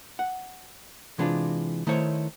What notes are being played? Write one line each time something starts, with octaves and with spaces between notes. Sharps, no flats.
F#5
C3 E3 G#3 D4 F4
D#3 A3 E4 C5 C#5